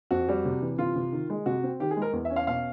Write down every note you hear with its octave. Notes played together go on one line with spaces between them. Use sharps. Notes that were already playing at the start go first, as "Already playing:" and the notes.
F2 F#4
G3
C3
E3
C3 F4
C3
D#3
G#3
C3 F#4
C4
D#3 G4
G#4
G#3 A#4
E2
E5
C#4
F5
B2 F5